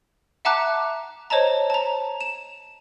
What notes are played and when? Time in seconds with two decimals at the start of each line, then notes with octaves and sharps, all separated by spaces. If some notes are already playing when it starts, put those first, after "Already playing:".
0.45 E5 F#5 A5 A#5 D6 F#6
1.30 C5 C#5 D#5 A5 A#5
1.70 A5 A#5
2.21 E7